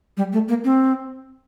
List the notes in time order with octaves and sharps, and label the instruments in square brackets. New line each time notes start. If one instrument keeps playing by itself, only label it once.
[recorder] G3
A3
A#3
C4